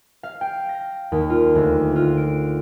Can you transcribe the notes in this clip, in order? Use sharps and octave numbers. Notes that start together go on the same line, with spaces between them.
F5
G5
A#6
D#2
F4
D2
F4
D7